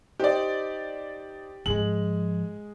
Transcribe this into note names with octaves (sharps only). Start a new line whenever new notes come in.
D#4 G4 C5 D5
G#2 F3 G#3 G#4 F#7